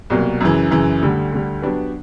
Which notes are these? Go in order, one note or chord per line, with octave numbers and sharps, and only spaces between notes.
C2 B2 F#3 A#3
F#2 C#3 E3
F#2 C#3 E3
D2 D3 G3
D2 D3 G3
F#3 B3 D4 G4 B4